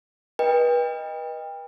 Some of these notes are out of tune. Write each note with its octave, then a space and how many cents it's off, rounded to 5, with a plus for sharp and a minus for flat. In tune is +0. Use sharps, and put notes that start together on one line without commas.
B4 -30 D#5 +0 G5 +30